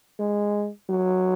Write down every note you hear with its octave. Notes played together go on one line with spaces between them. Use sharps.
G#3
F#3